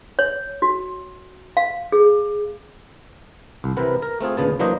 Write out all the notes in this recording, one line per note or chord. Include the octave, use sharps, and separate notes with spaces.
C#5
F#4
F5
G#4
C2
C3 E3 C4 A#4 B4 F#5
A#4
A3 C4 F4 G#4
D2 A#2 C#3 B3 A5
E3 F#3 A#3 D4 C5 D#5